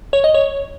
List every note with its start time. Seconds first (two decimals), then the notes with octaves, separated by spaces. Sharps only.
0.13 C#5
0.24 D#5
0.34 C#5